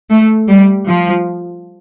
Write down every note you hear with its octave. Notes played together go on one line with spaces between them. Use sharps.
A3
G3
F3